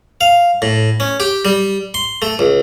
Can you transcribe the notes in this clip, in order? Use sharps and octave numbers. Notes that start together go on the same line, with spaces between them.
F5
A2
C#4
G4
G3
C6
A3
C#2